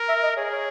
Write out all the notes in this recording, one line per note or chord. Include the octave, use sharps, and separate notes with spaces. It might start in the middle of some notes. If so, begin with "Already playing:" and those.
Already playing: A#4
E5
D#5
G#4 C#5
C#5